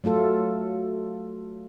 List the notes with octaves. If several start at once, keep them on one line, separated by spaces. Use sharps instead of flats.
F#3 A3 F4 A4